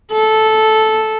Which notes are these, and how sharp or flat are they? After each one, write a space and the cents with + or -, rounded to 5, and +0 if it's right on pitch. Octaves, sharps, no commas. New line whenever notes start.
A4 -10